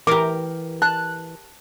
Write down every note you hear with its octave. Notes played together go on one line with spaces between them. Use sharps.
E3 G4 A#4 D6
A5 F#6